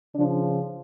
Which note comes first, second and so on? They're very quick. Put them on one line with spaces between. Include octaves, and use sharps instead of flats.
C#3 D4 F3